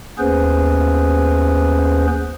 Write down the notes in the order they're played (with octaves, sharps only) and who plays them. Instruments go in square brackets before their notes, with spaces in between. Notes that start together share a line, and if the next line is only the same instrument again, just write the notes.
[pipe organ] D#2 B3 C#4 G#4 B4 C5